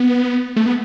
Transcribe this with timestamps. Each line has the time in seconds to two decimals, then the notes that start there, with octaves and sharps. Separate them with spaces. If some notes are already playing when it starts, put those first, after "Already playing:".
Already playing: B3
0.56 A3
0.66 B3